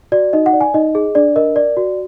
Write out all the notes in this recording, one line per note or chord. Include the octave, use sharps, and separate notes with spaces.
F#4 D5
D#4 D#5
F#5
D5
G#5
D#4 D#5
G#4
D4 D5
A#4 D#5
D5
F#4